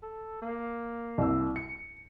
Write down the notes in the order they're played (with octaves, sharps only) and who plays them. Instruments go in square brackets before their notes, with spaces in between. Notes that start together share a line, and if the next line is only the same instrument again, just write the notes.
[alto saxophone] A4
A#3
[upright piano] C2 E6
C#7